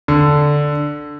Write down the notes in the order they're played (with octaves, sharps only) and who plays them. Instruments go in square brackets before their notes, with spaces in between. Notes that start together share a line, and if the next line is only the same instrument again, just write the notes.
[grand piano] D3